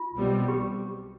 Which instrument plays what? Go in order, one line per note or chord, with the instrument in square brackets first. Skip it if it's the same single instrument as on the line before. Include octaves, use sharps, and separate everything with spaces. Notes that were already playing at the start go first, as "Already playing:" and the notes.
Already playing: [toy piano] F4
[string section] B1 B2 G3 C4
[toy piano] G4